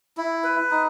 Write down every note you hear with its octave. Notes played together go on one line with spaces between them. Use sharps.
E4
B4
D#4